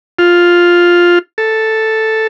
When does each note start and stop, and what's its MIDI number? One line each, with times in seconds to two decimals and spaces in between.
0.19 1.19 65
1.38 2.27 69